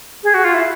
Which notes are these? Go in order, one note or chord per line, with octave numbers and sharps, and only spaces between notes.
G#4
F#4
F4
E4